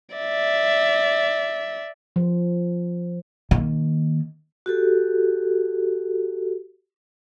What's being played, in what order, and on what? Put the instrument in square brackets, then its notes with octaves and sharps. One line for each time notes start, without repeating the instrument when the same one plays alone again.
[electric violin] D5 E5
[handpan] F3
[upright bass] D#3 A#3
[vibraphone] F#4 G4 A4